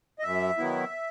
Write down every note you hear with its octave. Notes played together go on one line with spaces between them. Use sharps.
D#5
F#2 E5
D#3 F#3 B3 E4